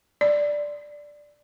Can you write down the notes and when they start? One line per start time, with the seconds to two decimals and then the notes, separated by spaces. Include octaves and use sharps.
0.21 D5